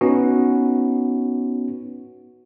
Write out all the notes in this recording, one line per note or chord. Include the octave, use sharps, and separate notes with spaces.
B3 C#4 D#4 F#4